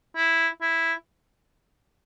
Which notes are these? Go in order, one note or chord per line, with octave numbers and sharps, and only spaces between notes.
E4
E4